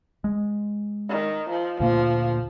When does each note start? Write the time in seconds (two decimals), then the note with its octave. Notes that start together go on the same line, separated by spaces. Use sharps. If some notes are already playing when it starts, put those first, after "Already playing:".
0.24 G#3
1.10 D#3
1.50 F3
1.80 D2 A#2 F3 A#3